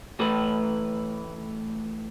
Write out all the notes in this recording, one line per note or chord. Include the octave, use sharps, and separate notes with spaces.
A2 E3 A3 B4